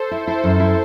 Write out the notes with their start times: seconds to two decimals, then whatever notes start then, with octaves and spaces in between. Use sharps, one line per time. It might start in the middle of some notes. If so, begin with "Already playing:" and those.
Already playing: A4 C5
0.11 E4
0.27 E4 A4 C5
0.44 F#2
0.60 E4